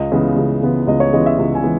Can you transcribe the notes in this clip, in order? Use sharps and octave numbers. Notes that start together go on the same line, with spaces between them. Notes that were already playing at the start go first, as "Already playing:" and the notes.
Already playing: C#2 D#5
C#3 E3 G#3 B3
C#2
C#3 E3 G#3 B3
C#2 D#5
C#5
C#3 E3 G#3 B3 D#5
E5
C#2
G#5
E3 G#3 B3